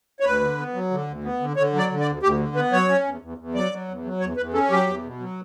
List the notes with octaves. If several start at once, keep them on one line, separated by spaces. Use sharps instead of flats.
C#5
D2 B4
D3
B3
F#3
D3
D2
B3
D3
D3 C#5
F#3
D5
D3
D5
D2
D2 G4
D3
B3 B4
F#3 C#5
C#4
E2
E2
E2
F#3 D5
F#3
E2
F#3
E2 C#5
E2 B4
C#4 A4
F#3 G4
E2
B2
F#3